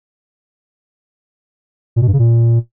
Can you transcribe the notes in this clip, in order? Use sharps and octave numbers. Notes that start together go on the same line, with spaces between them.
A#2
B2
G2
C#3
A#2